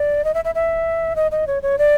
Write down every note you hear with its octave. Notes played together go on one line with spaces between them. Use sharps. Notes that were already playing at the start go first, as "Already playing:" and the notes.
Already playing: D5
D#5
E5
E5
E5
D#5
D#5
C#5
C#5
D5